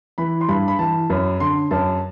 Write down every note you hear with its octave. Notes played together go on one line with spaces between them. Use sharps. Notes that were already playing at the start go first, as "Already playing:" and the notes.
E3 B5
C6
G2 B5
B5
E3 A5
F#2 B5
D3 C6
F#2 A5